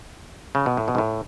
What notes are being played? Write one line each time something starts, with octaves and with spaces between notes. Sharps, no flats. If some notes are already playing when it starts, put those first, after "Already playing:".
C#3
B2
A2
B2
G#2
A2